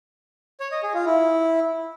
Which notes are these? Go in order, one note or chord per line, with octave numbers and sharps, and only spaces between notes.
C#5
D#5
G#4
F4
E4